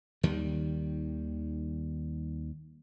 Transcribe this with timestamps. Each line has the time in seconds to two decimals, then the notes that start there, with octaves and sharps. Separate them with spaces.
0.23 D#2 D#3 G3